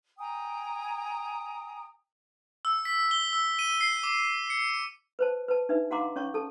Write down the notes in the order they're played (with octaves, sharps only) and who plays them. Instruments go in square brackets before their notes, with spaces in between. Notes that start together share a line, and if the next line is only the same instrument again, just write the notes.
[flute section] G5 G#5 A#5 D#6
[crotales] E6
B6
G7
E6
D#7
C7
D6
C#7
[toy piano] B4 C5 A5
B4 A5
D4 D#4 B4 E5
F#4 F5 F#5 A#5 C6 D6
C#4 C#5 C#6
A4 A5